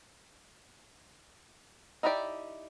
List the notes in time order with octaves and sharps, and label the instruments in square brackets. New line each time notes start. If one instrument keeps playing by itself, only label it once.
[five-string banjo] D#4 E4 F#4 G4 D5